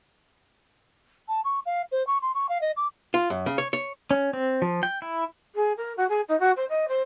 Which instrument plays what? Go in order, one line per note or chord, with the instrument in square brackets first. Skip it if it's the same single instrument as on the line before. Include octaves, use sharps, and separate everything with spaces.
[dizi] A5
C#6
F5
C5
C#6
C6
C#6
F5
D#5
D6
[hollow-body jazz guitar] F4
F#2
C#3
C#5
C#5
[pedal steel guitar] C#4
C4
F3
G5
E4
[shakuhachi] G#4
A#4
F#4
G#4
D#4
F#4
C5
D#5
C5